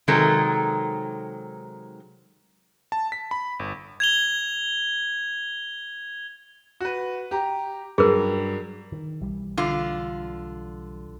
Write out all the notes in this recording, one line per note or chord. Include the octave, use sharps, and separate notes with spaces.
C3 D#3 F#3 G#3 A4 A#4
A5
B6
B5
G1
G#6 F7 G7
F#4 B4
G4 A#5
G2 F#3 G#4 A#4
D#3
B1 E3 G3
D3 F4